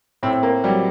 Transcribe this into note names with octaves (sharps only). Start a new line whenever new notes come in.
A2 C4
C4
A#3
F#3 G3